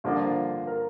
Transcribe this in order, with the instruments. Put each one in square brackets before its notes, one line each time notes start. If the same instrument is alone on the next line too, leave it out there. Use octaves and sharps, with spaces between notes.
[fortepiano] G2 D3 F3 A#3 D4 [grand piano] F4
[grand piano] F4
A#4